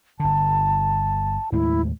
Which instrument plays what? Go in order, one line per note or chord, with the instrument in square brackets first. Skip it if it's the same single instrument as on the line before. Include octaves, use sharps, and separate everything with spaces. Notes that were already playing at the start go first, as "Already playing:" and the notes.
[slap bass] G1 D3 [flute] A5
[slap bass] D#2 A2 G#3 [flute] E4